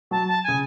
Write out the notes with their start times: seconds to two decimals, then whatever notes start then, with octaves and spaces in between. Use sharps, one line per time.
0.11 F#3 A5
0.27 A5
0.44 C#3 G#5